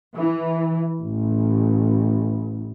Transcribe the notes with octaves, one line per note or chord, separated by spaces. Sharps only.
E3
A1